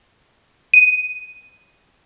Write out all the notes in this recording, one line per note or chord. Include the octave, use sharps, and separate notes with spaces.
D#7